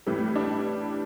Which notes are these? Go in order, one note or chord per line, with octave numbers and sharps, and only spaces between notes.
A2 E3 G3
D4